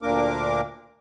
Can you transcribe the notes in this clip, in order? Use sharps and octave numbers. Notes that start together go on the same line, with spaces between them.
D2 A#2 A#3 D4 A#4 D6